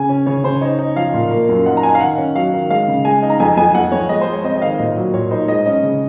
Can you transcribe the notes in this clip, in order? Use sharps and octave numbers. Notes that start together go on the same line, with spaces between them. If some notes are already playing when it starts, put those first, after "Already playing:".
Already playing: C#3 G#5
C#4
C#3 C#5
C#3 C5
D#4 C#5
D#4
F3 F5
A#2
A#3
F#2
D#4 F#5
A#5
D#4 G#5
F5
D#3 F#5
C#4
F#3 F5
D#3
G#3 F5
C#3
G#3 G#5
D#4
A#5
F2 G#5
F2 G#5
F2 F#5
F2 C#5
G#3 D#5
C5
G#3
C#5
C4 D#5
D#5
D#3 F5
A#2 D#5
F#3
A#2 C#5
D#4 C5
G#3 D#5
C#4 D#5
C#3